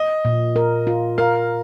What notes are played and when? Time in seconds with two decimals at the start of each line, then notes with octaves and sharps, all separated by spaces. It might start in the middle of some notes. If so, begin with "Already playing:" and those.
Already playing: D#5
0.25 A#2
0.56 A#4
0.87 F4
1.18 A#4 F5